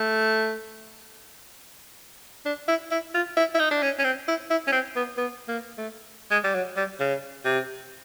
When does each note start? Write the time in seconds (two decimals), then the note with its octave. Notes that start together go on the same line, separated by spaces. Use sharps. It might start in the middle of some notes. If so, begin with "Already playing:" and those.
Already playing: A3
2.46 D4
2.68 E4
2.92 E4
3.15 F4
3.37 E4
3.55 E4
3.60 D#4
3.71 D4
3.83 C#4
3.99 C#4
4.04 C4
4.28 E4
4.50 E4
4.68 C#4
4.72 C4
4.96 B3
5.18 B3
5.48 A#3
5.78 A3
6.31 G#3
6.44 G3
6.55 F#3
6.77 G3
7.00 C#3
7.45 C3